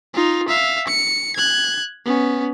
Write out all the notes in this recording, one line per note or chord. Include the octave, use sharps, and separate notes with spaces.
D#4 F4
E5 F5
C#7
F#6 G#6
B3 C#4